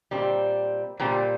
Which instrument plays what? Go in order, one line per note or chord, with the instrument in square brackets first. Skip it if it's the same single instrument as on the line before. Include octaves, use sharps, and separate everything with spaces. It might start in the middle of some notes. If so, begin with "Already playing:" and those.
[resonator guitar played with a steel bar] A#2 G3 C4
A#2 G3 C4